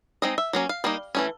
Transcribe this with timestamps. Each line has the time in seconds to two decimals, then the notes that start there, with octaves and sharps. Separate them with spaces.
0.22 G#3 C4 D#4 D#5
0.38 E5
0.53 F#3 A#3 C#4
0.69 F5
0.84 G3 A#3 D#4
1.15 E3 A3 C#4